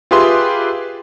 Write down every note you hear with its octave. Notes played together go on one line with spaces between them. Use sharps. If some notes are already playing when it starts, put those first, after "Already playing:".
F4 G4 G#4 B4 E5 C6